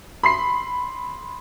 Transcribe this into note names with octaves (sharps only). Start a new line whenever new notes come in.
B5 C6 C7